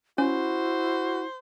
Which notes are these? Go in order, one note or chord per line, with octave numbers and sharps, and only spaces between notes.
C#4 E4 F#4 C5